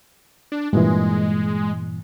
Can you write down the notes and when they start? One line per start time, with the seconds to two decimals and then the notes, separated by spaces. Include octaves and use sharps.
0.52 D4
0.73 G2 A#2 E3 G#3